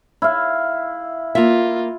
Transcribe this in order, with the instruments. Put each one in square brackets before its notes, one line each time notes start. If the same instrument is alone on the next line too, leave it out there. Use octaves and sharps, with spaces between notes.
[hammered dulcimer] E4 F5
[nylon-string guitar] A#3 E5 [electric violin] F4